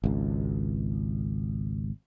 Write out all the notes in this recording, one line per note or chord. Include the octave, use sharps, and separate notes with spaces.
G#1 C#2